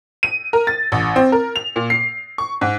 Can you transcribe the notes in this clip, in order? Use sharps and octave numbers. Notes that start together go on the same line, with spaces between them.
D#7
A#4
A6
A1
C4
A#4
F7
A#2
C7
C#6
G#2